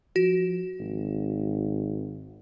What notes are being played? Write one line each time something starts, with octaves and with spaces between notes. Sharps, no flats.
F3 F#4
G#1